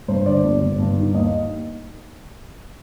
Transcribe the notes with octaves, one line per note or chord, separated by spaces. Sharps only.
G2 C5
D3 D5
G1
G1
G2
D#3
D#2 D#5